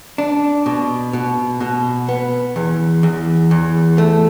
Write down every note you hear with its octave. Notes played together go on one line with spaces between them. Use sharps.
D4
B2
B2
B2
B3
E2
E2
E2
A3